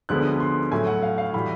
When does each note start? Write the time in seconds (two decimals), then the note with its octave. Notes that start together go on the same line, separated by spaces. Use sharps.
0.09 D2 D3 F3 G#3 B3 F#6
0.40 C6
0.71 A2 F#3 A3 G#5
0.87 F#5
1.03 F5
1.18 F5
1.34 A2 E3 G3 B5